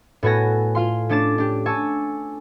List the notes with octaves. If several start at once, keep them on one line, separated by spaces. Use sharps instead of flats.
A2 B3 F#4 A4 G#5 A#6
F4 F5 C6
A3 C#4 D4 D6 A6 E7
D4 G4
G#5 A5 C#6 E6 A6